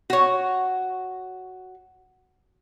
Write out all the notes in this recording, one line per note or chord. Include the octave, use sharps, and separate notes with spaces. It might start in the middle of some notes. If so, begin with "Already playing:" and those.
F#4 C#5